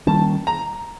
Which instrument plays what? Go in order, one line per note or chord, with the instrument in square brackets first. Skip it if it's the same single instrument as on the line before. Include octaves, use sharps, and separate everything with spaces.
[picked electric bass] D#3 G3 A#3 C#4 [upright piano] A5
[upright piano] A#5